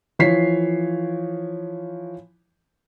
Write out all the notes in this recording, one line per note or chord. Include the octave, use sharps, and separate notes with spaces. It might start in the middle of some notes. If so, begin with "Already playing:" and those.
E3 F3 C#5 B6 C7